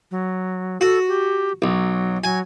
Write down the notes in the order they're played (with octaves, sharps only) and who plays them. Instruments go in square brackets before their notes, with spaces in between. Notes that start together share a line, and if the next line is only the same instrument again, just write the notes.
[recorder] F#3
[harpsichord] F#4 [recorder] A4
[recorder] G4
[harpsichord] B1 [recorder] F#3
[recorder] F#3 [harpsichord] G#5